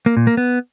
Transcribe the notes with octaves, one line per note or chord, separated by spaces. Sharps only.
A#3
A#2
A#3
B3